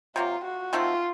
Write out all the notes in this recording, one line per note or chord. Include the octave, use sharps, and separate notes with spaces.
C3 F#3 A#3 F4
F#4
D#3 A3 C4 F4 F#4